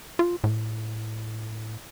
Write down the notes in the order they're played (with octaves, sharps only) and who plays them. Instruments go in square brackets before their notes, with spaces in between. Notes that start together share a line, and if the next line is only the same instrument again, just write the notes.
[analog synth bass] F4
A2